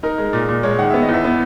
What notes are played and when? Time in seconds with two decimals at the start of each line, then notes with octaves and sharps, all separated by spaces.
0.03 D#4 A#4
0.18 G#3
0.33 A#2
0.49 A#2
0.63 G#3 C#5
0.79 D#3 F#5
0.90 B3 E5
1.02 D#5
1.09 E2 E5
1.24 B3